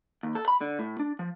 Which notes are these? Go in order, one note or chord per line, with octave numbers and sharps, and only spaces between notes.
D#2
A4
B5
D3
A2
D4
F3